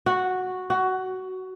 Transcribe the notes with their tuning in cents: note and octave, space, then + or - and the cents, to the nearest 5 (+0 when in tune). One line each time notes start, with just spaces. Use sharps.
F#4 -5
F#4 +15